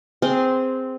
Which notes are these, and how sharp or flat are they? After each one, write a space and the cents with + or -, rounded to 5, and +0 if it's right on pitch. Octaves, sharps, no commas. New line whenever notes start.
C4 -10 G#4 -10 C6 +0